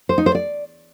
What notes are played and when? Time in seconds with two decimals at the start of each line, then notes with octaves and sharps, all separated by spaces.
0.09 C5
0.18 D#4
0.26 C5
0.35 D5